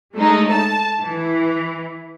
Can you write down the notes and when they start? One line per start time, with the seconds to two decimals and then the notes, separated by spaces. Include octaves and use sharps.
0.16 G#3 A3 D#4
0.50 A5
1.02 E3